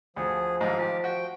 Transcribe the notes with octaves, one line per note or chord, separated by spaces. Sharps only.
D2 F3 G#4
A1 G#2 F5
F4 G4
F#4 G5